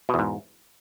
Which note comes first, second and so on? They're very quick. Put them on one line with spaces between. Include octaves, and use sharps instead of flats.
B2 E2 G#2